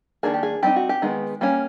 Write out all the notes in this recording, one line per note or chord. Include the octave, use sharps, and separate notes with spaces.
D#3 F#3 A#3 D4 G#4
G4
G#4
G3 C4 D#4 G4
F#4
G4
D#3 G#3 B3
G3 A#3 C#4